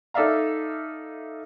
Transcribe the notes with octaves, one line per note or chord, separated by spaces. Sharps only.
D#4 A4 D5 E5 F5 A#5